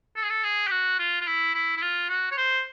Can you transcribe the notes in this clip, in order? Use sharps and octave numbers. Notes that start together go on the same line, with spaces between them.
A4
G#4
A4
G#4
G4
F#4
F4
F4
E4
E4
E4
F4
F#4
C#5
C5